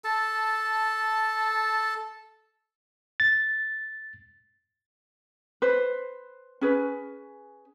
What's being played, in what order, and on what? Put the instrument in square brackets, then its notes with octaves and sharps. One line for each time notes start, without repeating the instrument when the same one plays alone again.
[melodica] A4 A5
[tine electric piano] A6
[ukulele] B4 C5
C#4 G#4 B4